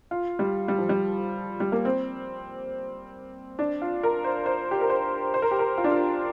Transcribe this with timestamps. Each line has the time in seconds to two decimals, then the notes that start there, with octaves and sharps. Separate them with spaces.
0.11 F4
0.39 G3
0.68 G3
0.78 F3
0.89 G3
1.60 G3
1.72 A#3
1.85 C4
3.59 D4
3.82 F4
4.03 A#4
4.24 C5
4.46 C5
4.71 G4
4.81 A#4
4.90 C5
5.34 C5
5.42 A#4
5.51 G4
5.59 A#4
5.78 F4
5.84 D4
5.91 F4